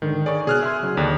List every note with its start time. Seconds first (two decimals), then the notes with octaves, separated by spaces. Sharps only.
0.02 G#2 D3 D#3
0.26 G#4 C#5 D5
0.47 B2 G#4 F6 F#6
0.63 E5 G#5 C6
0.83 C#3 F#3
0.97 D#2 D3 D4